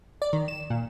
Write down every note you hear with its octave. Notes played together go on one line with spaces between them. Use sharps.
D5
D#3
E7
A#2